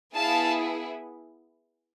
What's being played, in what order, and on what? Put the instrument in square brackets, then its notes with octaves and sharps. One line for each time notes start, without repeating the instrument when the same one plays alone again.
[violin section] B3 E4 G#4 F5 A5